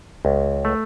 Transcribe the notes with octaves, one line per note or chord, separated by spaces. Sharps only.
C#2
A3